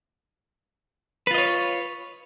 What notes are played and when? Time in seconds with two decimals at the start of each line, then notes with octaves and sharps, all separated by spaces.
1.27 B4
1.31 F4
1.34 D#5
1.38 C#5